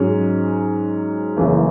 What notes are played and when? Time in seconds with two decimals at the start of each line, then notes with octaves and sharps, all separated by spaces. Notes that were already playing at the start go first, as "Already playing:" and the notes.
Already playing: G#2 F#3 C#4 G#4
1.36 F#1 F#2 C#3 E3 A3